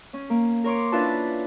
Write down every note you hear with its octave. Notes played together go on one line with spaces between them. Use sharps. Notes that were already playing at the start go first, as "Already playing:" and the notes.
C#4
A#3
A#4 C#5 C6 D6
C#4 D4 E4 F4 B4 A5